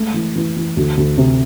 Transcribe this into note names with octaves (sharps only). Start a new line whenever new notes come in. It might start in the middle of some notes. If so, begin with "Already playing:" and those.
Already playing: G#3 A3
E3
E3
E3
D2
D2
C3